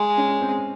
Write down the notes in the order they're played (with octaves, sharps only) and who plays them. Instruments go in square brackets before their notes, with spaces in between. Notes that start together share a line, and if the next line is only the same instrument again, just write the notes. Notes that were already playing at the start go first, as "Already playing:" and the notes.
Already playing: [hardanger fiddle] G#3
[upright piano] C#4
C4